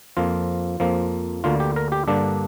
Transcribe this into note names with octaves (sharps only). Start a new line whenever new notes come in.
F2 F3 A#3 F4
F2 F3 A#3
D2 D3 A#3 F4
G4
A#4
G4
G2 D3 A#3 D4